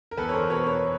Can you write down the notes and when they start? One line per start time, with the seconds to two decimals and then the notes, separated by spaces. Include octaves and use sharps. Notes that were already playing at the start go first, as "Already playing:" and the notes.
0.11 A#4
0.17 E2 A4 B4
0.29 C#5
0.33 A#4 C5
0.50 B2 B4 C#5
0.66 B4 C#5